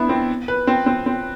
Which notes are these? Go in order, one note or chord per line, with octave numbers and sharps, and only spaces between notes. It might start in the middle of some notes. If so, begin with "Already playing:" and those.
Already playing: B3 D4 E4
C4
B4
C4
C4
C4